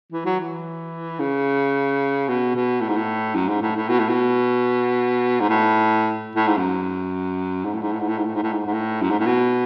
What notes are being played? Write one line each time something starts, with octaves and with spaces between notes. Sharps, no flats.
E3
F#3
E3
C#3
B2
B2
A2
G#2
A2
F#2
G#2
A2
A2
B2
A2
B2
G#2
A2
A2
G#2
F#2
G#2
A2
G#2
A2
G#2
A2
G#2
A2
G#2
A2
G#2
G#2
A2
F#2
G#2
A2
B2